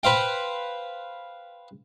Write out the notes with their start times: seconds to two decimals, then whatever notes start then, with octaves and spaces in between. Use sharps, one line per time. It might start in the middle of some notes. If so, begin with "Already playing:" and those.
0.03 B4 C5 F5 G5